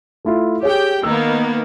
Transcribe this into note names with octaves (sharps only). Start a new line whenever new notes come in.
A3 E4 F4
G4 G#4 C#5 G5
D#3 A#3 B3 E6